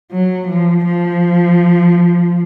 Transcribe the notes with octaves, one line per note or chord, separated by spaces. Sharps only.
F#3
F3
F3